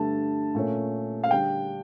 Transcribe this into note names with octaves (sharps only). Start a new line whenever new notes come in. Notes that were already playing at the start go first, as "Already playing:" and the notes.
Already playing: G2 D3 A3 A5
A#2 A3 C#4
F5
D3 G3 D4 G5